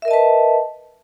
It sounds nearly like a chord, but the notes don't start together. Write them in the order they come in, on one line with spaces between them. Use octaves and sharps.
E5 A#4 D#5 A5 B4